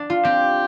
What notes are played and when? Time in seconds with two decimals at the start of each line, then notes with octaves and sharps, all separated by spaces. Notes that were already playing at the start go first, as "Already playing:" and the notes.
Already playing: D4
0.10 F4
0.25 C4 G4